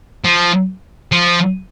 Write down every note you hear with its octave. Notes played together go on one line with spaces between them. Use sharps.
F3
F3